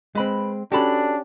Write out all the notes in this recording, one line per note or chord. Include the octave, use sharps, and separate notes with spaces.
G#3 C4 B4 B5
C#4 D4 F#4 G4 A4 B5